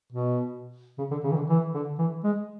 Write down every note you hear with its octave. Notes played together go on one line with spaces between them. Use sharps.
B2
C#3
D3
C#3
E3
D3
E3
D3
E3
G#3